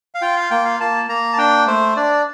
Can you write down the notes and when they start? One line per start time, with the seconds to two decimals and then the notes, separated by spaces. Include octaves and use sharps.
0.15 F5
0.22 F4 G5
0.36 F5
0.51 A#3 G5
0.65 F5
0.80 A#3 A5
1.09 A#3 A#5
1.33 A5
1.38 D4 G5
1.67 A3 C5
1.96 D4 D5